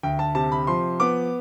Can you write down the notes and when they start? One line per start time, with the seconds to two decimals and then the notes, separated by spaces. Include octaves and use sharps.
0.03 D2 G5
0.19 A5
0.35 C3 A5
0.52 B5
0.67 F3 C6
1.00 B3 D6